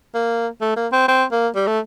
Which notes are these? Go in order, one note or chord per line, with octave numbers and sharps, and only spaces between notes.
A#3
A3
A#3
C4
C4
A#3
G3
A3